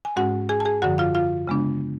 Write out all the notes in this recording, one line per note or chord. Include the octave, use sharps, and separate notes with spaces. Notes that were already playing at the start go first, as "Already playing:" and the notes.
G#5
G#2 G#3 C#4 F#4 F#5
G#4 G#5
A5
G#4 G#5
F#2 D3 F3 F#4 F#5
F4 F5
F4 F5
C#3 G#3 B3 D4